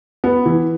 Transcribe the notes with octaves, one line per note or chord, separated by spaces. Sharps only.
B3
E3